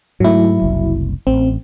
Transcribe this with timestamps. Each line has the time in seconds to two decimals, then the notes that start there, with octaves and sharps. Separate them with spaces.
0.20 G#2 F#3 A3 E4
0.62 F#1 C2
1.27 A1 C4